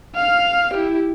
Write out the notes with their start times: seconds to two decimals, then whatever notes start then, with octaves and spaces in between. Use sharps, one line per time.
0.16 F5 F6
0.74 E4 G4